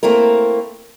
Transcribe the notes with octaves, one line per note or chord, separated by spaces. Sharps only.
A3 A#3 C4 E4 A#4